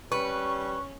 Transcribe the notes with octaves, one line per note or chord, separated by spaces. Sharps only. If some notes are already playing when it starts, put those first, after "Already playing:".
G3 C#4 B4 C#6